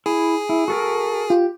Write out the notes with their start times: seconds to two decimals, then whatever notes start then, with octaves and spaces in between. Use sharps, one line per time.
0.06 E4 G#4
0.49 E4
0.68 F#4 A4 A#4
1.30 F4 G4